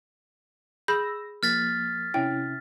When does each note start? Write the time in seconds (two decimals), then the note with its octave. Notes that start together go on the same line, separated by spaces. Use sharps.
0.88 G#4 B5 E6 G6 A#6
1.43 F3 A#3 F6 A6 B6
2.14 C3 C#4 E4 G5